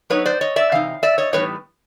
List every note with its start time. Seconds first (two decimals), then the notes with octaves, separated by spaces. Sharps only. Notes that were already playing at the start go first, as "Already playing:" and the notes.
0.10 F#3 B3 D#4 B4 C#5
0.26 C5 D5
0.41 C#5 D#5
0.56 D5 E5
0.72 C3 E3 D#4 F5
1.03 D5 E5
1.18 C#5 D#5
1.33 A2 E3 G3 B3 D#4 B4 C#5